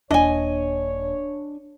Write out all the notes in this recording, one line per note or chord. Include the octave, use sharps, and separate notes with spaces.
D#1 D4 C#5 D#5 G#5